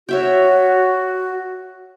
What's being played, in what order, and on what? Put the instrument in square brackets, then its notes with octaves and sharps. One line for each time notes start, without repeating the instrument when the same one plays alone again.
[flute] F#4 [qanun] C#5 E5 G5